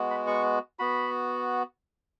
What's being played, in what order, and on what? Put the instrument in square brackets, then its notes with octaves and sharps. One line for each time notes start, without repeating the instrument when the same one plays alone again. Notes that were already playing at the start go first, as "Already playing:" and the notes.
Already playing: [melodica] G#3 B3 F#4
B5
C#6
B3 F#4 B5